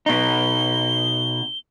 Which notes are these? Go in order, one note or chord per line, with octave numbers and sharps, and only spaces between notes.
B2 D#4 G7